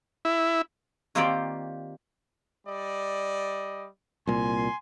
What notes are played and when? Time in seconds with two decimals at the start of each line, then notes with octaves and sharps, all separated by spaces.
0.25 E4
1.15 D#3 A#3 C4 F4 G4 D5
2.67 G3 D5 D#5
4.27 C2 A#2 G#5 C6